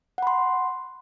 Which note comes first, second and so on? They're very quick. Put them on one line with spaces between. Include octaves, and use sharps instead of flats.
F#5 B5 C6